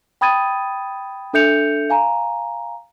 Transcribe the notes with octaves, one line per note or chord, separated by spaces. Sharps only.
G5 B5 D#6 G#6 A6 D#7
D4 A4 E5 G6 C#7 F7
F5 G#5 A#5